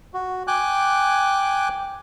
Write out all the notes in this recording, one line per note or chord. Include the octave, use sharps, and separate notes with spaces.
F#4
G5 G#5 D6 F#6